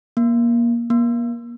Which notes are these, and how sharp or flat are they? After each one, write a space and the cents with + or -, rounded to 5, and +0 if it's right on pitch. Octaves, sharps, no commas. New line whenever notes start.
A#3 +20
A#3 +30